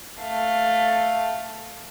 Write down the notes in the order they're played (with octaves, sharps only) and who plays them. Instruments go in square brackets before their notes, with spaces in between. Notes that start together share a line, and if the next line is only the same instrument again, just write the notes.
[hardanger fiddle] A3 F5